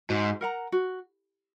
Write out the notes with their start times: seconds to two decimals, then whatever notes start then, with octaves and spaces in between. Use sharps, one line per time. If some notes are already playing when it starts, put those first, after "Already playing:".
0.09 G#2 F#4
0.41 A#4 F#5 A#5
0.72 F#4